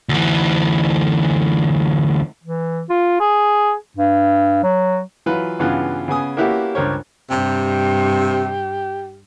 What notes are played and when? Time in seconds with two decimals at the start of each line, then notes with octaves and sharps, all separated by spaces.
0.09 D2 E3
2.44 E3
2.90 F4
3.20 G#4
3.97 G2
4.63 F#3
5.26 E3 F#3 F4 B4
5.59 G2 C#3 E3 B3 F4 F#4
6.08 C#3 B3 G#4 G#5 D#6
6.37 A#3 B3 C#4 E4 F#4 G4
6.75 C#2 G2 A#4 C5 C#5
7.30 G2 C3 G4